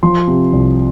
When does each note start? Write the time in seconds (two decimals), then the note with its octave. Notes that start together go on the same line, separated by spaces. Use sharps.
0.03 F3 C6
0.28 C3
0.53 C2